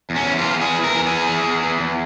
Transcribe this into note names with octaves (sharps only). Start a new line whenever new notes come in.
E2
C#4
E3
F4
E2
E3 G#4
E2
A#4
E3
G#4
E2
E3
E2
E3
E2